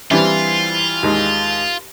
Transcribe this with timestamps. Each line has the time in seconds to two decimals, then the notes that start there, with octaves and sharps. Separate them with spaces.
0.11 E3 G3 C4 D4 E4 F4
1.03 D#2 G#3